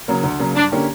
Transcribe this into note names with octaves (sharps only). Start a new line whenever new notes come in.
C#3 F#3 A#3
D2
C#3 F#3 A#3
G2 D4
D3 A#3 C#4 G4